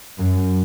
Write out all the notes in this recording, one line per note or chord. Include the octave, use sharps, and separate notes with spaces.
F#2